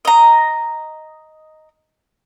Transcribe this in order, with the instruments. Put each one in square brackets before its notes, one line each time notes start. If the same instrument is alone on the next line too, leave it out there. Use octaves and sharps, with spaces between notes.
[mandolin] D#5 A#5